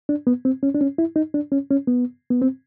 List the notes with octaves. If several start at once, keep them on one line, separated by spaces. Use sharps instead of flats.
D4
B3
C4
C#4
D4
C#4
E4
D#4
D4
C#4
C#4
B3
B3
C4